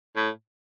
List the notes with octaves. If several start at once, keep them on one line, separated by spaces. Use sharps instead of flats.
A2